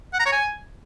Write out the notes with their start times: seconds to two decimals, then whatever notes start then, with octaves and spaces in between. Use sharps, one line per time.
0.13 F#5
0.20 A#5
0.26 C#5
0.32 G#5